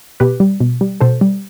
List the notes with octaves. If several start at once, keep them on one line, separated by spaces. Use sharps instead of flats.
B2 G4 B4
G3
B2
G3
B2 A4 C5
G3